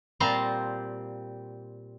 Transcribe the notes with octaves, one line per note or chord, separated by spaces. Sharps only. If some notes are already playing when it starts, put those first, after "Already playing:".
A#2 G3 C4 F5 A5 A#5